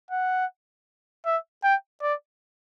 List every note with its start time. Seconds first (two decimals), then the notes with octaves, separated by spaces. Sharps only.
0.11 F#5
1.26 E5
1.63 G5
2.02 D5